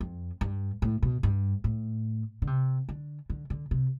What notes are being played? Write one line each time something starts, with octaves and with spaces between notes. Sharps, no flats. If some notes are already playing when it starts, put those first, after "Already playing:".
F2
G2
A2
B2
G2
A2
D3
C3
D3
D3
D3
C3